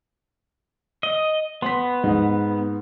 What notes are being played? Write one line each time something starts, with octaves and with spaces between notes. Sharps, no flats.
D#5
B3 C6 B6
G#2 D#4